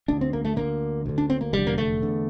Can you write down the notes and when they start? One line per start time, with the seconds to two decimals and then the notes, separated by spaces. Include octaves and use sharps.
0.08 D2 D3 D4
0.21 C4
0.33 A#3
0.45 A3
0.56 D2 D3 A#3
1.06 D2 D3
1.18 D4
1.30 C4
1.41 A#3
1.53 F1 E2 D3 G3
1.67 A#3
1.78 A3
2.02 E2 D3